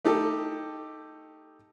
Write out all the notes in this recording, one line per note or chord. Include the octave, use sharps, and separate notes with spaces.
A3 D#4 G4 A4